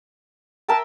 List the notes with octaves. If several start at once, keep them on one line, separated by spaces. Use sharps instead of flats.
A#4 E5 G5 A5